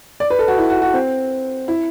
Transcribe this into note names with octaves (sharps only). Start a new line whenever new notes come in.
D5
B4
A4
F#4
E4
F#4
F#4
C4
E4